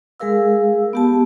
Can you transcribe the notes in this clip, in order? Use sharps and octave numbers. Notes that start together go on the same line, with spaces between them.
G#3 G#4 A#4 F5 E6
B3 G4 A5